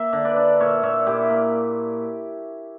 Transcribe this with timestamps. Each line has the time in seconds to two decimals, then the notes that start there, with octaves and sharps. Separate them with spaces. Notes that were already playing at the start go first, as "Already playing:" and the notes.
Already playing: A#3 E5
0.13 D3
0.25 B4 D5
0.36 D4
0.60 A#2 C#5 E5
0.83 A#2 C#5 E5
1.06 A#2 E4 G4
1.30 A#3